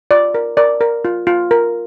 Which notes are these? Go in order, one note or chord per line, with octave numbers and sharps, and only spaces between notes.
F4 D5
A#4
A#4 D5
A#4
F4
F4
A#4